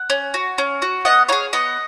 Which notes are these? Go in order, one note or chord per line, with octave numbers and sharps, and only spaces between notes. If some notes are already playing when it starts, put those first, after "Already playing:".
Already playing: F#5
C#4
F#4
C#4
F#4
B3 D#5 F#5
D#4 G#4 C#5 F5
B3 D#5 F#5